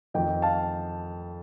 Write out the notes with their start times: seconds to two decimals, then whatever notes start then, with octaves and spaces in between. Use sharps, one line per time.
0.14 F2 D#3 D#5 G5
0.42 F5 A5